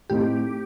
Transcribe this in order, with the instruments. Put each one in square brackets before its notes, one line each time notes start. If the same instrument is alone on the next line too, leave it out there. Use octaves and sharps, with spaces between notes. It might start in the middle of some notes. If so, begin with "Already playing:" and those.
[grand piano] A2 A3 C4 D#4 [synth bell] G4